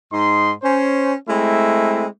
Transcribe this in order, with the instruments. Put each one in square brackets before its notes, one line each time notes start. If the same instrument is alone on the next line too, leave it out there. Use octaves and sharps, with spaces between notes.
[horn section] G#2 D#4 C6
C#4 C5
G#3 A3 C4 E4